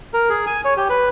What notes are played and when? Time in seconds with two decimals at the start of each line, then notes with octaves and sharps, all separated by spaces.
0.14 A#4
0.29 G#4
0.47 G#5
0.65 C#5
0.77 G4
0.89 B4